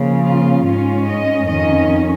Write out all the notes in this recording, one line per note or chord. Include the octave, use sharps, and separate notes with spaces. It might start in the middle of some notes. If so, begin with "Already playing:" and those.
Already playing: C#3 F3 A#3
F4
G#2 G#3 C#4 F4
D#5
F2 D#3 C#4 D#5